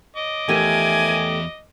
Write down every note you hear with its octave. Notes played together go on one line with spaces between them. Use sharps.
D#5 D6
E2 D#3 F3 A3 G4 A#4 G#5